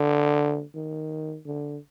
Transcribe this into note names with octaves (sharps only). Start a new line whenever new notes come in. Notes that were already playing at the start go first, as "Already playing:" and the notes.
Already playing: D3
D#3
D3